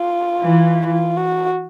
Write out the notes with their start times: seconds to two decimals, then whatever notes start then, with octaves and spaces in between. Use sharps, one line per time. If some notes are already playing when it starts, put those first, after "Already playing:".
Already playing: F4
0.40 E3
0.87 F4
1.17 F#4